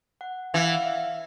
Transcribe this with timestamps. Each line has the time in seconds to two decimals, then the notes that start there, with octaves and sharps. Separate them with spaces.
0.21 F#5
0.54 E3 F5
0.64 F#5
0.75 F5
0.86 E5